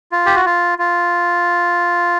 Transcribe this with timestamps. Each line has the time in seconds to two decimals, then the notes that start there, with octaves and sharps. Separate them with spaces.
0.12 F4
0.26 G4
0.36 F#4
0.45 F4
0.79 F4